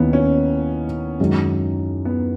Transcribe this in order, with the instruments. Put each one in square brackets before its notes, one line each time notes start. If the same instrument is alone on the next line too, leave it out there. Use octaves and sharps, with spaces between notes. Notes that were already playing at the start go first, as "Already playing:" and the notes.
Already playing: [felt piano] D#2 D#3 A#3 E4 [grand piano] B3 C#4
[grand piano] C#4
[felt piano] F#2 D#3 G#3 D#4
[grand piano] B3